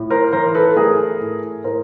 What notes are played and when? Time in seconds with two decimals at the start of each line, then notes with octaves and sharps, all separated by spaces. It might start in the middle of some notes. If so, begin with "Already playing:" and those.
Already playing: A2
0.10 A#4 C5
0.33 E3 A#4 C5
0.55 A4 B4
0.76 A3 G#4 A#4
1.21 A2
1.64 A2 A#4 C5